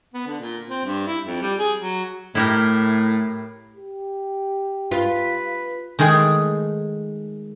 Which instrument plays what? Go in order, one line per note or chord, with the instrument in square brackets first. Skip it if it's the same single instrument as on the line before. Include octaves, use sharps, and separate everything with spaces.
[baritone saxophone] B3
D3
A#2
C4
G2
E4
F2
G3
G#4
F#3
[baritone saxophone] A2 [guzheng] E4 G4 A#4
[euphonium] G4
[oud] F4 [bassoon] B4
[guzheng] D#3 G#3 A3 G#4